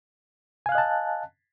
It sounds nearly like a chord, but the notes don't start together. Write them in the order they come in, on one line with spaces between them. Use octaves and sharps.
G#5 F5 F#6 D#5 A5